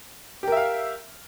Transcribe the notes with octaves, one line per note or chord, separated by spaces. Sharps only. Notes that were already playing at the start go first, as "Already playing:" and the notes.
G4 A#4 E5 F5